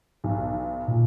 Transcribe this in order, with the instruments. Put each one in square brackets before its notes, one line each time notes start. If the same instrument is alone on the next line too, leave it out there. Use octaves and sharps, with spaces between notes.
[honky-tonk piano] B1
[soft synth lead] A#2